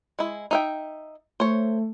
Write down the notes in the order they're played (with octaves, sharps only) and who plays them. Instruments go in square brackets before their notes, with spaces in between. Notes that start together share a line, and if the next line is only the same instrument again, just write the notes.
[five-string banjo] G#3 E4
D#4 E5 G5
[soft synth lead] A3 [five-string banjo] C5 C#5